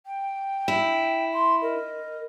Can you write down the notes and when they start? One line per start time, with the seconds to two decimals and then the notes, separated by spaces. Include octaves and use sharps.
0.06 G5
0.68 E4
1.33 C6
1.62 A#4 D#5